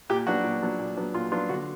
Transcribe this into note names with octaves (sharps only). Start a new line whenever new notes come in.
A#2 G4
F#3 B3 D4 F#4
A#2
F#3 B3 D4
A#2
F#3 B3 D4
A#2 F4
F#3 B3 D4 F4
D3 F#4